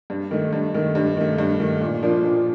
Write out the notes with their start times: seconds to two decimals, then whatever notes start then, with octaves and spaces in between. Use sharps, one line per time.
0.10 G2
0.31 D#3 A3
0.53 G2
0.74 D#3 A3
0.95 G2
1.17 D#3 A3
1.38 G2
1.60 D#3 A3
1.81 A#2
2.02 F3 A#3 D4 F4
2.24 A#2